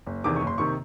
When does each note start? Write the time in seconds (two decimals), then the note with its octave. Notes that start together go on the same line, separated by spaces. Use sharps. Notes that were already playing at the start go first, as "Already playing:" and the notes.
0.06 F#1
0.24 E2 C3 D#3 D6
0.36 C#6
0.42 F#1
0.47 C6
0.58 C3 D#3 C#6